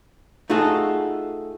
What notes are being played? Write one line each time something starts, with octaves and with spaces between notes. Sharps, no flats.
A3 D#4 F4 F#4 G#4 A4